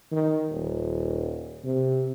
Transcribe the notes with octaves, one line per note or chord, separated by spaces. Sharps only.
D#3
D#1
C3